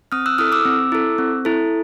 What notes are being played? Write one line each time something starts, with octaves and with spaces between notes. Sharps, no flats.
C4 D#6 F6
E6 F#6
E4 A4 D#6 F6
D6 E6
C4
E4 A4
C4
E4 A4